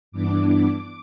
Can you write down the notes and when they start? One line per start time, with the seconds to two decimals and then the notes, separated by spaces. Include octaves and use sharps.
0.12 G2 E3 B3 D4 D6
0.45 D6